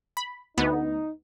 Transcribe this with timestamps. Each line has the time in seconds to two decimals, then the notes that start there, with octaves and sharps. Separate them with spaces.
0.17 B5
0.58 D2 B3 D#4